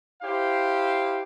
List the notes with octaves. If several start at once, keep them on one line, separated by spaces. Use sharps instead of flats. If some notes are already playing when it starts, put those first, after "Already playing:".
E4 G4 C5 F5